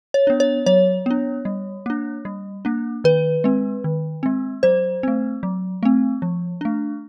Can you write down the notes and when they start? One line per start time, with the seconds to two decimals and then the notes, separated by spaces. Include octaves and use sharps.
0.14 C#5
0.27 B3 D4
0.40 C#5
0.66 F#3 C#5
1.06 B3 D4
1.45 G3
1.86 A#3 D4
2.25 G3
2.65 A#3 D4
3.04 D#3 B4
3.44 G#3 C4
3.84 D#3
4.23 G#3 C4
4.63 F#3 C5
5.03 A3 C4
5.43 F#3
5.83 A3 C4
6.22 F3
6.61 A3 D4